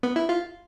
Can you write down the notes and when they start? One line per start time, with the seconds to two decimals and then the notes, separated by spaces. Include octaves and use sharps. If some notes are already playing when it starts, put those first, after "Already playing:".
0.03 B3
0.16 E4
0.29 F4